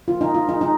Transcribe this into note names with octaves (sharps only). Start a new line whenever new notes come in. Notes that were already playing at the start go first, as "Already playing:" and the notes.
F4
D#4
F4
D#4
D#4